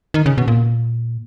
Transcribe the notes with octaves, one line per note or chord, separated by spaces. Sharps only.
D#3
C#3
B2
A#2